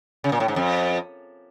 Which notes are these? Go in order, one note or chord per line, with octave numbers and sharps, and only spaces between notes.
C#3
A#2
A2
G#2
F2